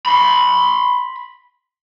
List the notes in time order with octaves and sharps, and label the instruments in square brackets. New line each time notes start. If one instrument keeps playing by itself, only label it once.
[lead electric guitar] B5 C6